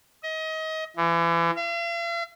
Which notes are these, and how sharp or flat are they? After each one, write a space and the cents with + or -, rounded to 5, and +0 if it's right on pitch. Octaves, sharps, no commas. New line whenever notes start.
D#5 +30
E3 +35
F5 -45